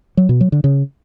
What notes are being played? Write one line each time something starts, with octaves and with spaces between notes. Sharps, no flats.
F#3
B2
F#3
D3
C#3